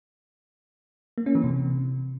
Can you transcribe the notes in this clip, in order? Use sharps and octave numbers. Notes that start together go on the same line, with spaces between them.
A#3
C#4
E3
C3